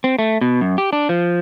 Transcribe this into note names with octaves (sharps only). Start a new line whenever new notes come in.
C4
A3
B2
F#2
G4
D4
F3